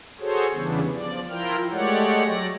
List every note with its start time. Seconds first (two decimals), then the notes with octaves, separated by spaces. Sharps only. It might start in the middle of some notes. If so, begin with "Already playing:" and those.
0.20 F#4 G#4 A4 C5 C#5
0.53 E2 C#3 E3 G3 B3 D4
0.94 F3 D5
1.29 F3 E4 F4 A#4 G5 F6
1.71 G#3 A3 G4 C#5 D5 F#5
2.23 F#3 D5 A#6